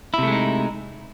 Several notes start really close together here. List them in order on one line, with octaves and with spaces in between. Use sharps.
E4 C3 A3 G#3 D#4